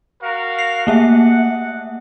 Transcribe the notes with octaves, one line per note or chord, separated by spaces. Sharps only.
F#4 A#4 F5
C7
A3 A#3 E5 F#5